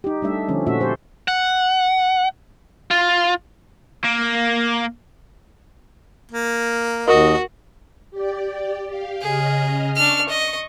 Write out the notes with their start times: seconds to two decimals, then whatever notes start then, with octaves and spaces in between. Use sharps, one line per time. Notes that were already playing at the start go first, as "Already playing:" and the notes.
0.04 D#4 G4
0.22 G3 A3 D4 E5
0.48 D3 F3 A3 C#4
0.66 A#2 A3 C#4 F#4 E5
0.80 G4 A4 C5
1.28 F#5
2.91 F4
4.04 A#3
6.32 A#3
7.08 D#2 F#4 A#4 D#5
8.11 G4 D5
8.86 G4 F5
9.21 C#3 G#4 D#5 F6
9.95 D4 C#6 F6
10.29 D#5